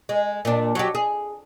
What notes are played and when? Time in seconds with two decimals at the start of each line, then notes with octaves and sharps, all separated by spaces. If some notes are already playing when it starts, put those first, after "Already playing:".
0.09 G#3
0.45 A#2 D4
0.75 F#3 F#4 G4
0.95 G#4